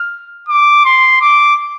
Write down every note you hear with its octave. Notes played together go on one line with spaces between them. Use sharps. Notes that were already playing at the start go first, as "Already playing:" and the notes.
Already playing: F6
D6
C6
D6